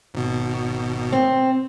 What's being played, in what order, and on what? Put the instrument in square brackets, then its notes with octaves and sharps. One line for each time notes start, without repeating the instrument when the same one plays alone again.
[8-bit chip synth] G#1 B2
[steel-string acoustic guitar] C4